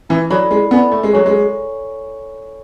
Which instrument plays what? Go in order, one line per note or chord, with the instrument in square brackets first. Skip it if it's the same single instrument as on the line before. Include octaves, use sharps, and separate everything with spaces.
[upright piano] E3 [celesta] E4
[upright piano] F#3 [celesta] A4 D5 G#5 B5
[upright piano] G#3 [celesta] E4
[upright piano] B3 [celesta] A4 D5 G#5 B5
[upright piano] A3 [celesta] A4
[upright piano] G#3
[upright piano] F#3 [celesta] C#5 G#5 C#6
[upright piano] G#3
[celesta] A4